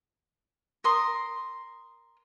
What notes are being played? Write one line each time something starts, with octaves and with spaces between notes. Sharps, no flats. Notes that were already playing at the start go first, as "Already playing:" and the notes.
A#4 C6 D#6